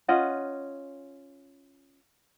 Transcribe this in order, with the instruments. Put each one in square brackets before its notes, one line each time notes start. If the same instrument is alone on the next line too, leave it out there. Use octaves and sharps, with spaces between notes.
[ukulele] C#4 F4 D#5 F#5